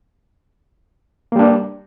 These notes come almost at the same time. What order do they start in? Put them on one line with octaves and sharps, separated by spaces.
A#3 G3 D4